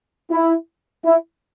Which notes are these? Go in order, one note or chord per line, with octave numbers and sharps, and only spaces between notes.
E4
E4